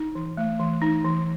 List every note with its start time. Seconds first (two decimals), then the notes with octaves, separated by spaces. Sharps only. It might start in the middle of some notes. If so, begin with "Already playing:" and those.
Already playing: D#4
0.15 E3
0.37 A3
0.60 E3
0.82 D#4
1.04 E3